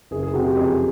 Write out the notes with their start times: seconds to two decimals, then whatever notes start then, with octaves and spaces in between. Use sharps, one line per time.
0.11 F#1 G#4
0.23 G#4
0.34 C3 F#4
0.45 G4
0.56 F2 G#4